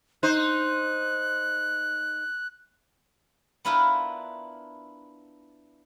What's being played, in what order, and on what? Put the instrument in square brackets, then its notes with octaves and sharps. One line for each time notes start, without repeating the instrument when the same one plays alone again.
[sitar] D#4 C5 [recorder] F#6
[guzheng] B3 D4 E4 F4 A#4 B4